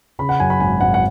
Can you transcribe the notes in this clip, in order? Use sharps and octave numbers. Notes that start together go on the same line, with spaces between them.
C#3 B5
F#5
F#2 G#5
B5
G#1 G#5
G#1 F#5
F#5